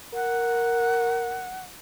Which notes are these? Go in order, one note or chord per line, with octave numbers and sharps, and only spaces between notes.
A#4 F#5